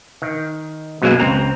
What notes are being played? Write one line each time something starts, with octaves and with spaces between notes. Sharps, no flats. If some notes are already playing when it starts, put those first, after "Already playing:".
D#3
F#2 B2 F#3 G#3 A#3
C#2 C4 A#5